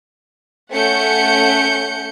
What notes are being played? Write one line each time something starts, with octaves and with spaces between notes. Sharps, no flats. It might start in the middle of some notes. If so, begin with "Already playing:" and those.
A3 C#4 F#5 G6 C#7